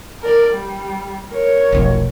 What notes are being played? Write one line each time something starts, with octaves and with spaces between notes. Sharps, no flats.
A#4 D5
G3
A#4 C#5
F1 B1 F2